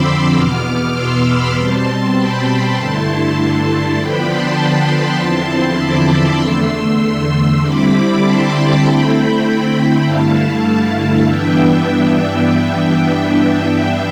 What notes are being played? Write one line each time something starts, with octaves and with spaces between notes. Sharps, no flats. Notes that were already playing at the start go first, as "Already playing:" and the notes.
Already playing: F2 D3 F3 C4 B5 C6 D6 E6
E2 B2 B3 D6 F6
C6 E6
B5 D6
B2 G3 C4 A5 C6
G5 B5
G2 D3 A3 E4 A5 C6
D3 F3 B3 D4 G5 B5
A5 C6
E2 D3 F3 C4 E4
B5 D6
C6 E6
E2 D3 A3
D3 G3 C4 E4 B5 D6
A5 C6
G5 B5
D3 A3 C4 E4 G5 B5
G5 B5
G2 D3 A3 E4 F5 A5
G2 E3 B3 D4 E5 G5